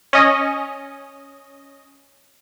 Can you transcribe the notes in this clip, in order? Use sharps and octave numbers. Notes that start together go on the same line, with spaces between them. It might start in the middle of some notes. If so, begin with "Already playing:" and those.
C#4 D#5